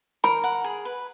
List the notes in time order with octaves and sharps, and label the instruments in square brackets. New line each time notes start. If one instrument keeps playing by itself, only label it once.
[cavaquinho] A#4 [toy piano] B5
[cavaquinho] F#5
G#4
B4